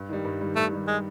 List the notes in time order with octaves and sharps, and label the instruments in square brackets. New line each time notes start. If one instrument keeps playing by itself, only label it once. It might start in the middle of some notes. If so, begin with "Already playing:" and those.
Already playing: [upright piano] G2
D#3 G3
G2
D#3 G3
[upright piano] G2 [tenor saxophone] A3
[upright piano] D#3 G3
[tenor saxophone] G#3